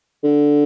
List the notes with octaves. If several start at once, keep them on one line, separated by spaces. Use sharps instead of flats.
D3